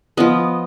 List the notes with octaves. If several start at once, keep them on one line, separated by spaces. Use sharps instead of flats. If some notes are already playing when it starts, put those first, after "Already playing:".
F3 B3 D#5